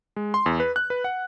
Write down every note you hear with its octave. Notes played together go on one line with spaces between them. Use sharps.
G#3
C6
E2
B4
F#6
B4
F#5